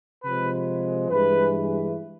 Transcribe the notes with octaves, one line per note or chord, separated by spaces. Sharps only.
C3 F3 G#3 B4
G2 E3 G#3 B4